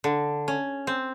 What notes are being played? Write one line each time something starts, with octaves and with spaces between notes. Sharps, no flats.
D3
C#4
C4